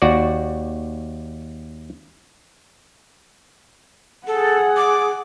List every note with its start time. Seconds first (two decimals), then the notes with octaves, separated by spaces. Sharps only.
0.02 D#2 F#4 D5
4.27 G#4 A4 F#5
4.77 D6